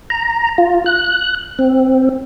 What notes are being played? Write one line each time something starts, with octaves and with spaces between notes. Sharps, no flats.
A#5
F4
F#6
C4